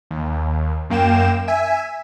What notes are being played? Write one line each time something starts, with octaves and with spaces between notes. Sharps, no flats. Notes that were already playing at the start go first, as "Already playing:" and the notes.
D#2
F#2 A#3 G5 E7
E5 G#5